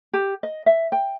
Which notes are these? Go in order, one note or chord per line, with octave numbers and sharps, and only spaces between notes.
G4
D#5
E5
G5